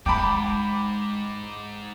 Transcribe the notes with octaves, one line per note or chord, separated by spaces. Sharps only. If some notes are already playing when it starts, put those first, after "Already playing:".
G#2 G#3 G5 A5 B5 D6